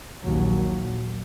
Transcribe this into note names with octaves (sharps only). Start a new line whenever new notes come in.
A#1 D#2 F#3